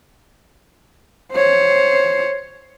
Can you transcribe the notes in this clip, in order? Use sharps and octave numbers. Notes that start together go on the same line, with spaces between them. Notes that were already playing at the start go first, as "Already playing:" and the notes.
C5 C#5